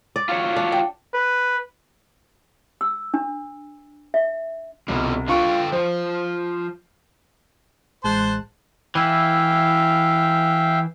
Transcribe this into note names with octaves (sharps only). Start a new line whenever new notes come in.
D5
F4 F#4 C#5
D4
G5
B4
E6
D4
E5
C2 B2 D3 F3
D3 D4 F4 B4 G5 C#6
F3 C5
A1 G#3 C5 A5 C6 F#6
E3 E4 E5 F5 G5